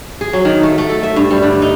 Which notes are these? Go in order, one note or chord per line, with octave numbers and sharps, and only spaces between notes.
G#4
F#3
D#3
A3
A3
A4
E5
G2
G3
D3
D#4